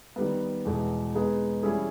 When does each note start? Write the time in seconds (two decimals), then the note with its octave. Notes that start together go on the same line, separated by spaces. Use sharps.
0.16 D#3 G3 B3
0.65 E2 B2 G#3
1.15 G#3 B3 D#4 G#4 D#5
1.63 E3 G3 C#4 E4 G#4